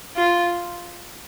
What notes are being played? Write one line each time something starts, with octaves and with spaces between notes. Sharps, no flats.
F4